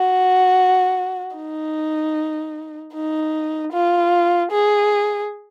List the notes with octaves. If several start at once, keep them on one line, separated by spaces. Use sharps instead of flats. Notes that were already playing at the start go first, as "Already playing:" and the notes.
Already playing: F#4
D#4
D#4
F4
G#4